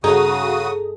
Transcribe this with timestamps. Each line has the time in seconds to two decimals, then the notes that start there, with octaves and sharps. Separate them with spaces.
0.04 G2 C#3 D#4 F#4 G#4 A4 D#6